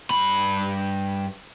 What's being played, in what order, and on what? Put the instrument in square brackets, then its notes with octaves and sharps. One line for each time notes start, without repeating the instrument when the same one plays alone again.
[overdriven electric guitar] G2 B5